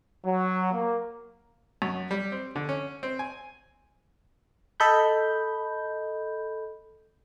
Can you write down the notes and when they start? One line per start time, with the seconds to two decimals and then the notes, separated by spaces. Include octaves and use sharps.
0.25 F#3
0.72 A#3
1.82 F#2
2.11 G3
2.32 C4
2.56 D3
2.69 C#4
3.03 C4
3.19 G#5
4.80 A4 D#5 B5 G6